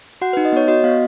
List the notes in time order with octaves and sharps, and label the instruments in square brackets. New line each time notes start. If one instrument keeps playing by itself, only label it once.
[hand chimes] F#4 F#5
D#4 B4
D#5
B3 C#5
F#4 D#5
B3 F5